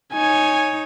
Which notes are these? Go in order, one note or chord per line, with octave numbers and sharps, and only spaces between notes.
D#4 C#5 G#5